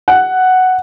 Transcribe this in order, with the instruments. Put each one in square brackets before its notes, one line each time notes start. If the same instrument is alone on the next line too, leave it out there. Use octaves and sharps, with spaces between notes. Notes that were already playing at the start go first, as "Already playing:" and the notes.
[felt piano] F#5